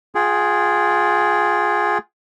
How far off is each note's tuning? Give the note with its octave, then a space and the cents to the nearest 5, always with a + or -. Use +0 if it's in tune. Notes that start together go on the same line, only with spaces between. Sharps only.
F4 +10 G#4 +0 G5 -30